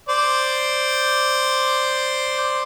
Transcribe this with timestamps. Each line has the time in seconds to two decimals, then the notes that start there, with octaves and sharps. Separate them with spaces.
0.09 C5 D5